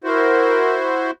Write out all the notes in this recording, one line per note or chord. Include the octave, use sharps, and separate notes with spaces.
E4 F#4 A#4 C5